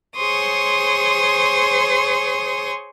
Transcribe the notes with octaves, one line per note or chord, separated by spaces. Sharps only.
G#4 C5 C#5 C6 C#6 D#6